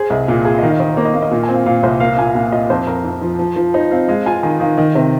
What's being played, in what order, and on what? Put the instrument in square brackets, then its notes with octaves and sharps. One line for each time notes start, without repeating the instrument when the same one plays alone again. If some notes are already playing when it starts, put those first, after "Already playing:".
Already playing: [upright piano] G#4 [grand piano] C5
[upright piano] C2 [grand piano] D#5
[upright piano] A#2 [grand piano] F5
[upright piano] G#4 [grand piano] G#5
[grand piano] D#5
[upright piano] D#3 [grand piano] F5
[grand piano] D#5
[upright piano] D#3 [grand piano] C5
[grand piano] A#4
[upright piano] A#3 [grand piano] C5
[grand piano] D#5
[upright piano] A#3 [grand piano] F5
[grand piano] D#5
[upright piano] A#2 [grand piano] F5
[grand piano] G#5
[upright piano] C4
[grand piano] F5
[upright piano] A#2 [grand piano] F5
[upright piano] C2 [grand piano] C5
[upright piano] A#3 [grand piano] F5
[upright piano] A#2 [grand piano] G#5
[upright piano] A#2 [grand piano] F5
[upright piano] F4 [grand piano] D#5
[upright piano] F2 [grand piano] C5
[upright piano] F2 [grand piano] A#4
[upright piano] F2
F3
F3
F3
[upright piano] D#4 [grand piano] C5
[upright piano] C4 [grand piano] F5
[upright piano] G#3 [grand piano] F5
[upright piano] F4 [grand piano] G#5
[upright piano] D#3 [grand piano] G#5
[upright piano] D#3 [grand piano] F5
[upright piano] D#3 [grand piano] D#5
[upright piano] C3 [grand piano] C5